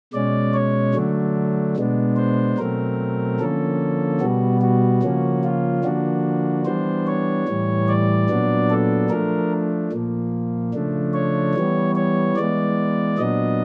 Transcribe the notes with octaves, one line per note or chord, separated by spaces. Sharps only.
B2 G#3 C#4 D5
C#5
D3 F#3 A3 D4
B2 G#3 B3 D4
C5
B2 F#3 A3 C4 A#4
D3 F3 A#3 C#4 A4
B2 G3 B3 F#4
F#4
C#3 F3 A#3 C#4
F4
D3 F3 A#3 D4 F#4
E3 G3 B3 D4 C5
C#5
A2 E3 G3
D5
A#2 F#3 B3 D4
A4
F3 A3 D4 A#4
A#2 F3 A#3
C#3 F3 A3 D4
C#5
E3 G3 B3
C#5
E3 G#3 B3 D5
A#2 F#3 B3 D4 D#5